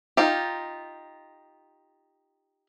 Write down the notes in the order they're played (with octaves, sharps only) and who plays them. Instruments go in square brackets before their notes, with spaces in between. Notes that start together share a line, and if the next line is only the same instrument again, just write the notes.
[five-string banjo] D#4 F4 G4